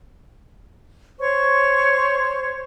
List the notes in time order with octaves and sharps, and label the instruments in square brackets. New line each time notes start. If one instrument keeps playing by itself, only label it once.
[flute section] C5 C#5 C#6